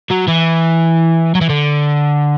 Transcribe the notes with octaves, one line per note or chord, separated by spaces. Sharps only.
F#3
E3
F#3
E3
D3